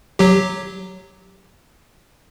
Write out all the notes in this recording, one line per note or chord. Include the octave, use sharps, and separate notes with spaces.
F#3 G4